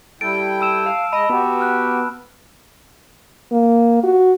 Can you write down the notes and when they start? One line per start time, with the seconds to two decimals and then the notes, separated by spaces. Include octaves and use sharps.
0.21 G3 E4 A4 G5 D7
0.61 A5 E6 E7
0.86 F5
1.13 G#3 D#5 B5
1.30 B3 F#4 G4
1.60 F6 F#6
3.52 A#3
4.04 F#4